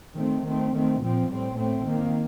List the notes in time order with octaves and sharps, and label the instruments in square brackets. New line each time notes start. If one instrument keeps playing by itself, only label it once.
[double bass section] D#3 A3 C4
D#3 A3 C4
D#3 A3 C4
A#2 F3 C4
A2 G3 C4
A2 A3 C4
D#3 A#3